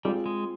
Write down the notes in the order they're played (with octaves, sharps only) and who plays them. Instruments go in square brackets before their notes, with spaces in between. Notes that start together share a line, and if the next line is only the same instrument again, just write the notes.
[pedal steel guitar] G3 [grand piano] G#3 C4 F4 G#4
[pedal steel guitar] G#3